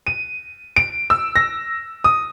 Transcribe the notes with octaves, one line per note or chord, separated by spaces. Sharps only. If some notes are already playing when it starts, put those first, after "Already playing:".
D#7
D7
E6
A#6
D#6